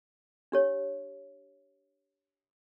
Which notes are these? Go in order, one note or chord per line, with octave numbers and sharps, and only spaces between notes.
D4 G4 C#5